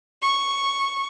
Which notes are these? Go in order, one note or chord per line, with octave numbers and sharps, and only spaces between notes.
C#6